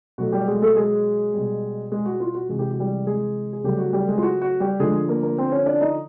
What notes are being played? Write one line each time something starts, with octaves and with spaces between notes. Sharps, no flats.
B2 F#3 A3 F#4
G3 G4
G#3 G#4
A3 A4
G#3 G#4
B2 G3
G#3 G#4
F#4
F4
F#4
C3 E3 G#3 G#4
G4
F#4
G3 G4
G#3 G#4
G#4
C#3 F#3 G3 A3 G4
F#4
G3 G4
G#3 G#4
F4
F#4
F#4
G3 G4
D3 F3 G#3 A3 G#4
A#3 A#4
A#3 A#4
C4 C5
C#4 C#5
D4 D5
D#4 D#5